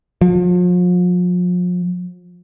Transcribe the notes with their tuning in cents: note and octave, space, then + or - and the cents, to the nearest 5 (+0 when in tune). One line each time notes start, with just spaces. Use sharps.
F3 +40